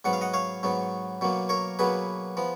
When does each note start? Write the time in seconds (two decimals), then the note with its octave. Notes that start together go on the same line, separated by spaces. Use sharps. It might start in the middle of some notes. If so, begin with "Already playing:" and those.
0.05 G#2 F#3 B3 F#5
0.13 F5
0.21 D#5 F#5
0.34 C#5 F5
0.63 G#2 F#3 B3
1.21 B2 F#3 A#3
1.49 A#4 C#5
1.79 B2 F#3 A#3 G#4 B4
2.37 F3 B3